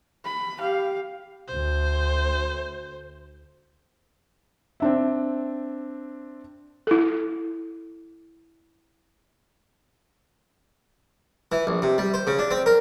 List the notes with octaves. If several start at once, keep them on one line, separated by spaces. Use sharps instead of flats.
B5
G4 F5
D2 C5
C4 D4 E5
E4 A4
E3
A#1
C3
G3
C5
C#3
D4
C4
A#4